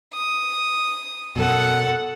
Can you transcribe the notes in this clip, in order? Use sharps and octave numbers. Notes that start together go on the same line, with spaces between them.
D#6
F#2 B2 A4 F#5